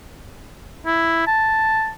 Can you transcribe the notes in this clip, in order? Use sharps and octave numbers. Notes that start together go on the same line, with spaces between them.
E4
A5